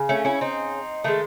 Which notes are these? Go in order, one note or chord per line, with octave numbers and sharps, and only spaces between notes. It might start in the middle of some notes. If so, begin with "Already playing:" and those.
Already playing: C#3
A3 C#4
C#4 E4
C4 D#4
D#3 G#3 A3